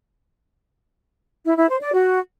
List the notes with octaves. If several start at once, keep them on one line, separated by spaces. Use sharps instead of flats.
E4
E4
C5
D5
F#4